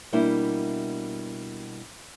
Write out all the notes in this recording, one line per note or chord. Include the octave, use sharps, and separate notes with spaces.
B2 G3 A#3 D4 E4